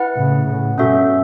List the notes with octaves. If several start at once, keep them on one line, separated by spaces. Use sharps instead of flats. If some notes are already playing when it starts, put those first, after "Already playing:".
Already playing: E4 B4 F#5
A2 C#3
A2 C#3
G2 B2 C#4 F#4 A4 E5